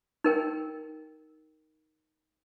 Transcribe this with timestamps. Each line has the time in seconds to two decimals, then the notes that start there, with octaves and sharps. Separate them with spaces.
0.24 D#4 A#4 G5